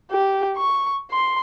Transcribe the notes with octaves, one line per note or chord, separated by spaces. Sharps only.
G4
C#6
C6